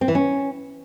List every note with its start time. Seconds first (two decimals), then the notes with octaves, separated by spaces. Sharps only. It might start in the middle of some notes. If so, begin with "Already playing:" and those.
0.01 C4
0.08 E3
0.15 C#4